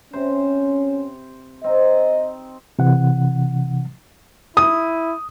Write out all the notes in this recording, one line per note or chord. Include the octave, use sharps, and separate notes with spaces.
C3 C#4 C5
C4 D#4 D#5
C3 E3 F#5
E4 D#6